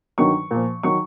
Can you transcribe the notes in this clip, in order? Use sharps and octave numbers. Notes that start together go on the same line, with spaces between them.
G2 D#3 F#3 C#6
A#2 F3
D#3 F#3 C#6